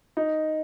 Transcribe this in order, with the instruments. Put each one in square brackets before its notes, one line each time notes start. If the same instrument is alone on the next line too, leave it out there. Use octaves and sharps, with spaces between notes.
[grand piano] D#4